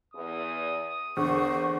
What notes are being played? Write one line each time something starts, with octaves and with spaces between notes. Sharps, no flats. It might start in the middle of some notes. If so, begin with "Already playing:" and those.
E2 D#6
E2 D3 A#3 C5 C#6